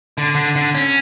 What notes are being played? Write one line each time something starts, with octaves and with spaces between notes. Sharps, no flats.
D3
D3
D3
C#4